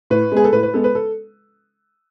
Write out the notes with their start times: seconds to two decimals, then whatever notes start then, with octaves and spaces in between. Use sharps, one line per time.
0.10 A2 B4
0.32 G#3 B3 G#4
0.44 A4
0.52 A2 B4
0.63 B4
0.74 G#3 B3 A4
0.84 B4
0.95 A4